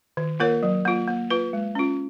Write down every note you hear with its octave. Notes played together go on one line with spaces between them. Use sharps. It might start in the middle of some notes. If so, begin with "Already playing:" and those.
D#3
A#3 F4 A#4 C#5
F#3
A#3 F4
A#3
F4 B4
G#3
C#4 F4